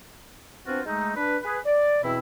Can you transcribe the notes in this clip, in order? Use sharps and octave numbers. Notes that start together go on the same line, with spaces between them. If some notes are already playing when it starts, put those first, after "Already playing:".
B3 C4 D4 F4 F#4 C5
G#3 A3 D#4
D4 B4
G#4 B4
D5
E2 B2 C4 E4